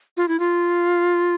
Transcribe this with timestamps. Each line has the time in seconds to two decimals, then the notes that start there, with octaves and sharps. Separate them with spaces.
0.17 F4
0.28 E4
0.40 F4